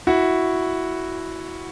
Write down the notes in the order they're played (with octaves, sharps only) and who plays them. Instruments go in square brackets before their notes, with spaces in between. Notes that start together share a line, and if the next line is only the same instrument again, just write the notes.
[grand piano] E4 F#4